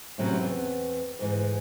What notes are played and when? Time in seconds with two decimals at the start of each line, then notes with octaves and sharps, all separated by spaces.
0.18 A2 C3 F#3 C4 C#4 B4
0.40 E2 B3 C4
1.19 D2 G#2 E3